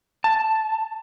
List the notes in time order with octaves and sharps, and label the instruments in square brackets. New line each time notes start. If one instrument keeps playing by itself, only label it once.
[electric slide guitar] A5